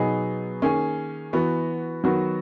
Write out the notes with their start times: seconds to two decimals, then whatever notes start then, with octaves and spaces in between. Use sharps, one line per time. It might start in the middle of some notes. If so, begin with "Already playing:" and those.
Already playing: B2 F#3 B3 D#4 G#4
0.62 D#3 A#3 C#4 G#4
1.33 E3 B3 F#4
2.04 D#3 F#3 B3 F#4